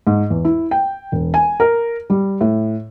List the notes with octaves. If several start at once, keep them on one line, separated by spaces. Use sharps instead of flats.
G#2
E2
E4
G5
E1
G#5
A#4
G3
A2